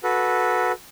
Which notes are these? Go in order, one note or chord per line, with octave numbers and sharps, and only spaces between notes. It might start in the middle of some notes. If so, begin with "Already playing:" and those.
F#4 A4 B4